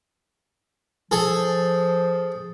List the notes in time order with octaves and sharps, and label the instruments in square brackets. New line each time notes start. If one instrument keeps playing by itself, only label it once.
[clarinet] F3 [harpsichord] G#4 A4